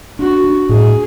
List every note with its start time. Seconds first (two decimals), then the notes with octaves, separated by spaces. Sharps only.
0.19 D4 F#4
0.44 D4
0.69 A2 G#4